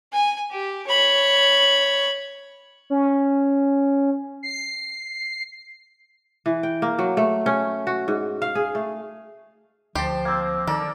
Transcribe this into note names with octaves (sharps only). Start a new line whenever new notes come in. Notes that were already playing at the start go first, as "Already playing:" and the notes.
G#5
G4
C#5 B5
C#4
C7
E3
G5
A#3
F#3
A3
C#4
F#4
G#2
F5
G#4
A3
D2 F3 G4 A5 C6
A#3 C4
D#3 A4 A#4 D5